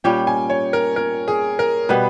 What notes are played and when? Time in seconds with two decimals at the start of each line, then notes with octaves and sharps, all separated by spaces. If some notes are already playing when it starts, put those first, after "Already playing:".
0.04 A#2 G3 C#4 G4 G5
0.27 G#5
0.50 C#5
0.73 A#4
0.96 A#4
1.28 G#4
1.59 A#4
1.89 B2 G3 B3 B4